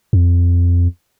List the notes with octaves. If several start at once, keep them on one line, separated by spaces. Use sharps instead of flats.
F2